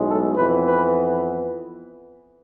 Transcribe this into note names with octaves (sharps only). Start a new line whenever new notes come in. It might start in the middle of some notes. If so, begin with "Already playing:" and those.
Already playing: B1 A2 G#3
A4
F2 E3 B3 B4
B4